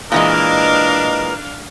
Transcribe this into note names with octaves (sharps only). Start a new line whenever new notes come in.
A#2 E3 G#3 D4 A#4 D#5 F5